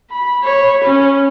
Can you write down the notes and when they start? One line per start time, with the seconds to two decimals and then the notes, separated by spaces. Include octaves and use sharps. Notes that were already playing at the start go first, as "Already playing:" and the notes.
0.11 B5
0.43 C#5 B5
0.85 C#4